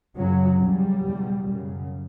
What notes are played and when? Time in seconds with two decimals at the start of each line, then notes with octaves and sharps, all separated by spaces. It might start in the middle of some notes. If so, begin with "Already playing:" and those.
0.16 F#2 C#3 F#3
0.60 E2 C#3 G3
1.04 E2 B2
1.49 F#2 C#3